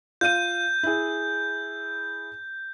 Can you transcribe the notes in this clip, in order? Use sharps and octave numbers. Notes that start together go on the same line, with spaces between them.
F4 F5 G6 D#7
E4 G#4